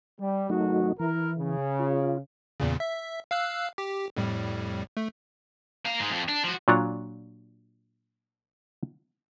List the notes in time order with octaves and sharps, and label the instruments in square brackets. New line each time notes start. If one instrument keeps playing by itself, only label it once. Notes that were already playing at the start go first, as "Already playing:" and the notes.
[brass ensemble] G3
[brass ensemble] G#1 F#4 [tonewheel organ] F#3 A3 D#4
[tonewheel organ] E3 [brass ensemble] E4 A#4
[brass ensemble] C#3
[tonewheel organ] F4
[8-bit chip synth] E2 A#2 C#3
E5
F5 E6 F#6
G4
F2 A2 G3
A3
[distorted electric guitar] A#3 F5
G#2 G#3
F2
D4
F3 F#4
[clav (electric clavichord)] A#2 F#3 D4 F4 C#5 A#5